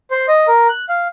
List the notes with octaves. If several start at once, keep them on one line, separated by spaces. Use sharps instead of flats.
C5
D#5
A#4
F#6
F5